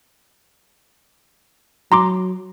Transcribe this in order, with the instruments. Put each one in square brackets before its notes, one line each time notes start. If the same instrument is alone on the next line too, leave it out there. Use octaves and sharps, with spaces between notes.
[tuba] F#3 [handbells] A#5 C6 D6